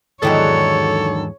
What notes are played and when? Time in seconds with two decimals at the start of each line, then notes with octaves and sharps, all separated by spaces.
0.22 E2 G#2 D3 D#3 F#3 E4 A4 C#5